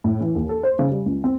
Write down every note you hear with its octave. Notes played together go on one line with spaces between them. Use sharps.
A2
E3
D#2
A4
C5
C#3
G3
C#2
C4